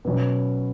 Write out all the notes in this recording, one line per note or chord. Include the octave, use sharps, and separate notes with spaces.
B2 F#3 C#4